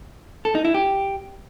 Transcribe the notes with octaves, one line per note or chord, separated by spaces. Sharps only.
A4
D#4
E4
G4